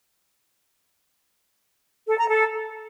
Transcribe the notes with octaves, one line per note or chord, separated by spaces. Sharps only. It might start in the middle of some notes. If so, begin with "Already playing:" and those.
A4
A#5
A4